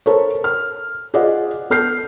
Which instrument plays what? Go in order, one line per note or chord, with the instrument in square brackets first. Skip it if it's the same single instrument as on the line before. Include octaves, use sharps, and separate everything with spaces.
[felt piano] A4 A#4 C5 C#5
F6
F4 G#4 C5 D5 D#5 F#5
B3 A4 F6 G6 C7